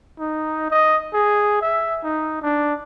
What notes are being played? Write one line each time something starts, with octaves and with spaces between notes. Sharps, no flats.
D#4
D#5
G#4
E5
D#4
D4